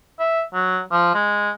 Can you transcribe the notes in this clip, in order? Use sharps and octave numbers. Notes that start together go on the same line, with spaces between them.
E5
F#3
F3
G#3